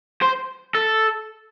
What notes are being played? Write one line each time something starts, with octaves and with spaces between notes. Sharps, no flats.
C5
A4